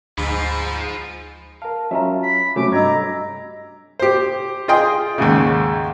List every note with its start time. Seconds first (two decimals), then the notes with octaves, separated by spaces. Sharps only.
0.18 D2 G#2 F3 B5
1.62 A#4 F5 A5
1.91 F#3 C#4 F4 E5 A#5
2.23 B5
2.56 C3 F#3 A3 C#4 B5 D6
2.72 G2 D4 D#5 A#5 E6 G#6
3.99 G4 C5
4.68 F4 G#4 D#5 G5 C6
5.18 D#2 G#2 C#3